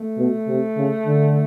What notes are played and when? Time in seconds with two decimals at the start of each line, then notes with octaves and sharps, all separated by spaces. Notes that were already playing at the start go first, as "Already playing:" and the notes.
Already playing: A3
0.17 B2
0.47 C3
0.77 C#3
1.06 D3